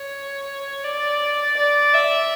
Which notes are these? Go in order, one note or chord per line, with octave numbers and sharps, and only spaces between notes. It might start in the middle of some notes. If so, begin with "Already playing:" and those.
Already playing: C#5
D5
D5
E5